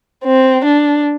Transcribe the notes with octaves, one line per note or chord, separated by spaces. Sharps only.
C4
D4